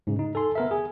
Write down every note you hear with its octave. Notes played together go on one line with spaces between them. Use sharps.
G#2 C#3
D#4
A4 G#5 C6
B3 A#4 E5
G#4 G#5